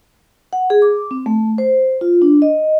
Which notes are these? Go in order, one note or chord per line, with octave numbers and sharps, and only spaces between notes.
F#5
G#4
D6
C4
A3
C5
F4
D4
D#5